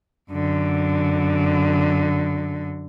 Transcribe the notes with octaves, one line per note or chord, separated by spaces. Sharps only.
F#2 D3